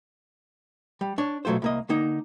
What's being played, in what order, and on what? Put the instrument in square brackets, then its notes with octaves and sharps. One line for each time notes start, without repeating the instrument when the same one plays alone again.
[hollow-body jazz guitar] G3
D4 C#5
B2 F#3 A3 F4 C5
C2 A#3 D#5
D3 A#3 D#4